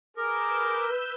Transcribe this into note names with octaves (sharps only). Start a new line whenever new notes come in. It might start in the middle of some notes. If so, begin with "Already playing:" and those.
G#4 A#4 B4 D6 E6 G6